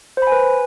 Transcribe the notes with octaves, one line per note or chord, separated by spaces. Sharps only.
B4 C5 G#5 B5